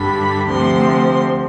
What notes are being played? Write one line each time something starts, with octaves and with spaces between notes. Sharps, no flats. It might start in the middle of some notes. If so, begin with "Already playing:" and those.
Already playing: G2 D3 G3 B5
D2 C3 F3 C6